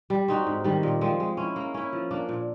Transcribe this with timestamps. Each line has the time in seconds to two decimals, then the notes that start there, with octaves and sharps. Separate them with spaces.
0.10 G3
0.28 C4 D#4 F#4
0.47 G#2
0.64 D#3 G3
0.83 A#2
1.01 F3 G#3 C4
1.20 G#3
1.37 C#4 E4
1.56 A#3
1.74 C#4 E4
1.93 F3
2.11 A#3 D4
2.29 A#2